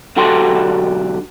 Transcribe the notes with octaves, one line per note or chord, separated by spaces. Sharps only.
B1 D3 F#4 G4 A4 C6